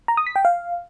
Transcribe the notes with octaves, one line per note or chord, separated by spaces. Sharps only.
A#5
D#6
B6
G5
F5